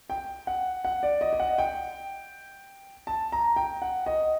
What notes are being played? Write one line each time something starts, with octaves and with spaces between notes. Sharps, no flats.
G5
F#5
F#5
D5
D#5
D#5
F#5
G5
A5
A#5
G5
F#5
D#5